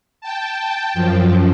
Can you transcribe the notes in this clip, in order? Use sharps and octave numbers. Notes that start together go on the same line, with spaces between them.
G5 A5
F#2 F3